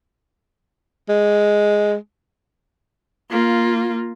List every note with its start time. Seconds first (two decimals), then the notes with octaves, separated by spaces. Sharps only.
1.09 G#3
3.30 A#3 F4